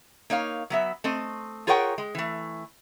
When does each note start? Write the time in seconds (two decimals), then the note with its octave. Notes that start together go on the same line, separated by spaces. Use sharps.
0.30 A#3 D#4 C#5 F5
0.70 F#3 B3 E5
1.04 A3 C4 D#5
1.67 F4 G#4 A#4 C#5 F#5 G5
1.98 G#3
2.15 E3 A3